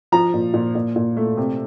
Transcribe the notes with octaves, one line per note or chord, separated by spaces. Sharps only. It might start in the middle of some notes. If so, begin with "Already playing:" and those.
F3 A#5
A#2
A#2
A#2
A#2
A3
C3